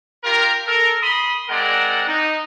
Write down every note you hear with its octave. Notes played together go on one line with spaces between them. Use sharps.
F4 G4 A#4
A4 A#4
B5 C6 D#6
G#3 C4 A#4 D5 F#5
D#4